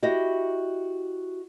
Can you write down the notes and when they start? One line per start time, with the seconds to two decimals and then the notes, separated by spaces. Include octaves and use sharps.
0.03 E4 F#4 G4 D#5